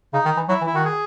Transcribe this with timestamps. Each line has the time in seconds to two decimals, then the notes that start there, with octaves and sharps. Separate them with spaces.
0.13 C#3 D#4
0.25 D#3
0.37 E3
0.48 F#3 E4
0.61 E3
0.67 E4
0.73 D#3 F#4
0.85 G#4